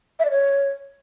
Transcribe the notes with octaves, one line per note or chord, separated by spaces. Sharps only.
E5
D5
C#5